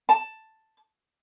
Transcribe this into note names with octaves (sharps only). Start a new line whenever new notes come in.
A5